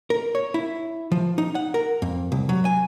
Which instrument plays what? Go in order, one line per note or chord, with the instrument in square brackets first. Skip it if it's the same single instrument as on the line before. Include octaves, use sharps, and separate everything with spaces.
[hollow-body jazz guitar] A#4
C#5
E4
F3
D#4
F#5
A#4
F2
C2
F#3
G#5